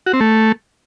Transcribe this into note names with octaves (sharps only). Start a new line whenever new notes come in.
F#4
C4
A3